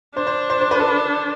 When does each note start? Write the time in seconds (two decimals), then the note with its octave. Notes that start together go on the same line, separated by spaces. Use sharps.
0.16 D4 C5
0.27 C5
0.50 C5
0.61 C5
0.71 B4
0.79 A4
0.88 B4